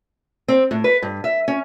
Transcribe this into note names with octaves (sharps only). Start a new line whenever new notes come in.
C4
A2
B4
G2
E5
C#4